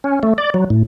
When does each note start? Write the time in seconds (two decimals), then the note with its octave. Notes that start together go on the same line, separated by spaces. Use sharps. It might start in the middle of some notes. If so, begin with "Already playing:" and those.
0.04 C#4
0.23 A3
0.38 D5
0.54 F#3
0.70 A2